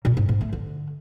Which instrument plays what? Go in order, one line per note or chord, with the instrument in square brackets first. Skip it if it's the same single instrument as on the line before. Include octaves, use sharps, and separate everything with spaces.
[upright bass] A#2
G#2
G#2
A3
D3